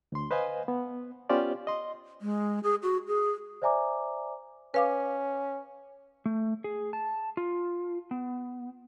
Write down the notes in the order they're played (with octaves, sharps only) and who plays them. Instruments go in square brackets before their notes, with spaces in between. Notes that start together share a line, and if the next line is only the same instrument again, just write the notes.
[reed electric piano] D2 C6
B4 C5 D#5 F5 G#5
B3
B3 C#4 F4 G4 C5 D5
D#5 C6
[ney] G#3
G#4
F#4
G#4
[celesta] C5 D5 E5 G#5 A#5 D6
[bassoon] C#4 [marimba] B4 F5 D6
[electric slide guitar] A3
G#4
A5
F4
B3